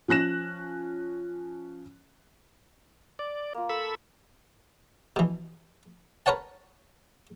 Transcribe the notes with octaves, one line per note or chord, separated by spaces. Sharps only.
F3 C#4 F#6 A#6 E7
D5
A#3 F4
A4 B5 E6
B2 E3
A#4 B4 C#5 F#5 A5